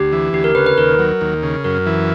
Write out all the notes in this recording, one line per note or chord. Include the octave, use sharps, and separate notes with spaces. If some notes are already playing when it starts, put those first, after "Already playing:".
Already playing: D2 G4
E3
D2 G4
A#4
C#3 B4
B4
D#2 A#4
F#3
D#2
C#3
F#2 A#4
E3